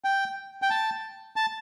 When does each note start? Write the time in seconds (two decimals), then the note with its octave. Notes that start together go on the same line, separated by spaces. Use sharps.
0.04 G5
0.62 G5
0.70 A5
1.36 A5